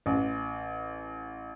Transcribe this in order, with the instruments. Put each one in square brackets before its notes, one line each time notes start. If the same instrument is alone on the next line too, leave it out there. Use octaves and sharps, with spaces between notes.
[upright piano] A1